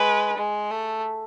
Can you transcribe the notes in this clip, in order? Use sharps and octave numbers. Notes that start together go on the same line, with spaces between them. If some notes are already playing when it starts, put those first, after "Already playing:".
Already playing: G#3 B4
G#3
A3